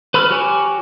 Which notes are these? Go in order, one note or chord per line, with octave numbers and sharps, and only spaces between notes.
B4 B5 E6 F6
F#4 G4 C#5 G#5